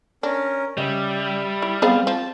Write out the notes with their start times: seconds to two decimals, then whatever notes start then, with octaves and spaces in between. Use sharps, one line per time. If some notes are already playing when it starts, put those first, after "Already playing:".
0.23 C#4 D4 A#4
0.77 C#3 G3 D#5 E5
1.62 E4
1.82 B3 C4 G#4 C5 F5
2.07 F3 A5